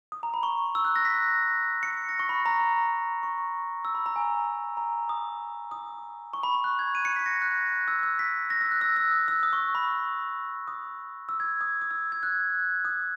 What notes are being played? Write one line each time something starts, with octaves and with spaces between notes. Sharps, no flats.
D#6
A#5
B5
C#6
E6
F#6
A#6
B6
C#7
A#6
C#6
B5
A#5
B5
C#6
E6
B5
A#5
G#5
A#5
D#6
D#6
C#6
B5
C#6
F#6
G#6
D#7
C#7
B6
A#6
F#6
E6
E6
B6
A#6
E6
F#6
E6
E6
D#6
E6
D#6
C#6
B5
D#6
E6
G#6
D#6
D#6
E6
G#6
F#6
D#6